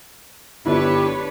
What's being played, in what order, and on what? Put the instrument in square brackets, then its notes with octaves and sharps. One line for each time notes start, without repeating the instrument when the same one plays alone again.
[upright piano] G1 E4 [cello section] D4 B4 C#5 [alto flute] G4